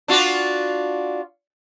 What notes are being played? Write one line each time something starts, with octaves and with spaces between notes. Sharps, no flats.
D4 F4 F#4